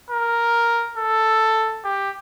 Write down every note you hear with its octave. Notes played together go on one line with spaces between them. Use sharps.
A#4
A4
G4